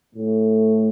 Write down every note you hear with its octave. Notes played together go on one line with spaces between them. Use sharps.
A2 A3